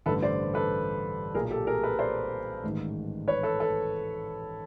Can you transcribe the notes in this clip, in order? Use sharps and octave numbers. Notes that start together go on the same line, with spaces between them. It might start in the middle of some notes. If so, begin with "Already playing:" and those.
A1 G2 D3 A4 B4
C5 D5
A4 B4
B1 A#2 G#4 A#4
G4 A4
G#4 A#4
A4 B4
C5 D5
A1 G#2 D#3
B4 C#5
A4 B4
A4 B4